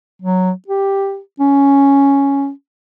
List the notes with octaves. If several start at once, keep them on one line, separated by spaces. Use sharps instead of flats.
F#3
G4
C#4